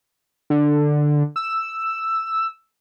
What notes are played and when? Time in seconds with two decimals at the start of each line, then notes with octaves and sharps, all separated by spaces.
0.50 D3
1.36 E6